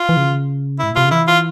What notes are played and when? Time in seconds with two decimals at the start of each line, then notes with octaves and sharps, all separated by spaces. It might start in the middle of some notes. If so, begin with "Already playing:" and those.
Already playing: F4
0.09 E3
0.17 C#3
0.79 G#2 E4
0.91 A#2
0.95 C3 F4
1.05 C#3
1.11 E3 E4
1.27 F4